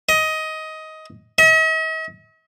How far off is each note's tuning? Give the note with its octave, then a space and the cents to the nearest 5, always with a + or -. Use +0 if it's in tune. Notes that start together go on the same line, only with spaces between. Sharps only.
D#5 +15
D#5 +45